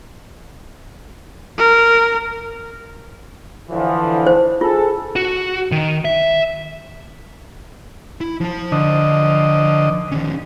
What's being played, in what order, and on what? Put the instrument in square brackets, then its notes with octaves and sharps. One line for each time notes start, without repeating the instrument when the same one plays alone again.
[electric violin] A#4
[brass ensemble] D3 E3 F3
[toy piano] C5
[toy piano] F4 [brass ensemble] G#4 A4
[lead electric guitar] F#4
D#3
E5
E4
F3 A5
[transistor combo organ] D3 D#5
[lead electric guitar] D#3 C#4